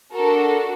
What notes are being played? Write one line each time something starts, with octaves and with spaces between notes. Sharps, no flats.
D4 F#4 A4 A#4